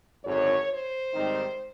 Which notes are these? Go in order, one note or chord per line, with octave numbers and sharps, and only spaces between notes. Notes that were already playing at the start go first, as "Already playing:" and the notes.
G#1 F#2 D3 C#5
C5
G#2 D#3 G3 C4 D#4